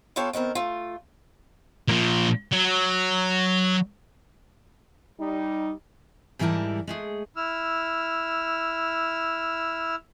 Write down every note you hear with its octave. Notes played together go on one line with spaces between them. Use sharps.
B3 F4 A4 C#5 F5 G5
D#3 B3 C4 A#4
A3 F4
A#2 F3
F#3
G3 D#4
G#2 E3 G3 E4 A#4 A5
G#3 A3 G#4
E4 E6 F6